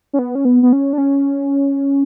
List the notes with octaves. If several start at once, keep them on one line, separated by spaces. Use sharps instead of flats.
C#4
B3
C#4
B3
B3
C#4
D4
C#4